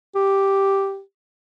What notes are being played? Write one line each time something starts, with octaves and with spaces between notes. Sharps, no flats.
G4